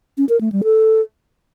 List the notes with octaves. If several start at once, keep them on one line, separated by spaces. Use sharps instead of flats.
C#4
A#4
A3
G3
A4